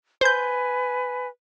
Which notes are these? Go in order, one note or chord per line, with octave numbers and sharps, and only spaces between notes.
B4 C5 G#5 G6